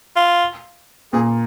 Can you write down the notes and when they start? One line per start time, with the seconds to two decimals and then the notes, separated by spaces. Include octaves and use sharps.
0.16 F4
1.13 A#2 A#3 G#4